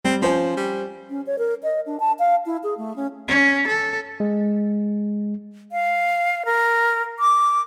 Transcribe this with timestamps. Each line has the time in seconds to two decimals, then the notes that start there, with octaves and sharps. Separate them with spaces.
0.05 G3 C4
0.22 F3 C#4 C5 G#5
0.57 G3
1.10 C#4
1.27 C#5
1.39 A#4
1.63 D#5
1.86 D4
2.00 A5
2.19 F5
2.46 E4
2.63 G#4
2.78 A3
2.96 C#4
3.28 C#4
3.67 A4
4.20 G#3
5.72 F5
6.45 A#4
7.19 D6